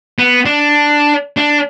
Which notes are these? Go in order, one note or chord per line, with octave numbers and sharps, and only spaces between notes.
B3
D4
D4